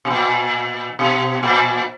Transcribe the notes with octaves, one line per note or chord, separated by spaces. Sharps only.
B2
A#2
B2
A#2